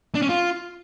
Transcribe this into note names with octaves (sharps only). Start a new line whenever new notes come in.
D4
C#4
F4